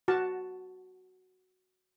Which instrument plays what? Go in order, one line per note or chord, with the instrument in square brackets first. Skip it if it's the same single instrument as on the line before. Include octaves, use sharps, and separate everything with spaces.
[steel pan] F#4 A5